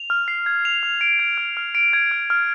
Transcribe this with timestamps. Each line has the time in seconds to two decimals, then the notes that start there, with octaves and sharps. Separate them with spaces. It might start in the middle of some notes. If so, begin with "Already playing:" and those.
Already playing: F7
0.10 F6
0.28 C7
0.46 G#6
0.65 F7
0.83 F6
1.01 D7
1.19 G#6
1.38 F6
1.57 F6
1.75 D7
1.93 G#6
2.11 F6
2.30 F6